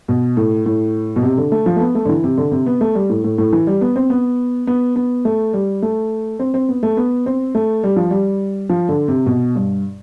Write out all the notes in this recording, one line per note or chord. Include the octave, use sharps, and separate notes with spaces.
B2
A2
A2
B2
C3
D3
A3
F3
A3
B3
A3
D3
E3
C3
D3
C3
B3
A3
G3
A2
A2
A2
E3
G3
B3
C4
B3
B3
B3
A3
G3
A3
C4
C4
B3
A3
B3
C4
A3
G3
F3
G3
F3
D3
C3
B2
G2